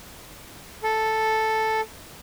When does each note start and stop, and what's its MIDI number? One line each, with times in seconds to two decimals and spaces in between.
0.83 1.81 69